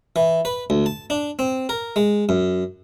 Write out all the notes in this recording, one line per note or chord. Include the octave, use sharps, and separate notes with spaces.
E3
B4
D2
A5
D4
C4
A#4
G#3
F#2